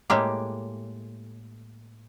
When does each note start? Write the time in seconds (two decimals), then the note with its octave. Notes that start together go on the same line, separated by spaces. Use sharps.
0.10 A2 G#3 A#3 G4